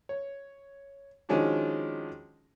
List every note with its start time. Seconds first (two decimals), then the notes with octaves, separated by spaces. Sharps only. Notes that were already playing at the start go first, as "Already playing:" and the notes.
0.09 C#5
1.29 D#3 F3 G#3 C#4 D4 F#4